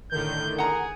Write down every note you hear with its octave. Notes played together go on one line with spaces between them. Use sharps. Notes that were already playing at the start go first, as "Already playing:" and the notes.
A2 D3 D#3 G6
G#4 F#5 A#5